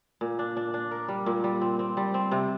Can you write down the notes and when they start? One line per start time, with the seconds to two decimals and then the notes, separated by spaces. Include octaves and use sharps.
0.21 A#2
0.39 D4
0.57 D4
0.74 D4
0.91 A#4
1.08 G3
1.26 A#2
1.44 G3
1.61 C4
1.79 C4
1.97 G3
2.14 C4
2.31 C3